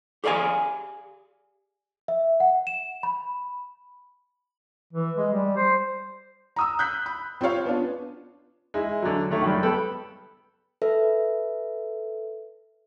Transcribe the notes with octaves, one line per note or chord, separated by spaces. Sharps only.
G4 G#4 D5 F5 G#5
E5
F#5
E7
B5
E3
G#3
G3
C5
A#5 D#6 E6
F#6 G6 B6
B5
C4 F4 G4 C#5 F5
B3 C#4 D4 F4
G#3 E4
D3 F#3
D#3 A3 C#5
C#2 F#2 G3
B3 A4 G5 B5
A4 B4 E5